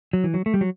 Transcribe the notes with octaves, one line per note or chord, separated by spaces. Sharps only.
F#3
E3
F#3
A3
G3
F#3